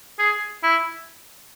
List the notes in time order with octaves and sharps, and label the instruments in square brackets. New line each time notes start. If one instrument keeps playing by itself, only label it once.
[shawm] G#4
E4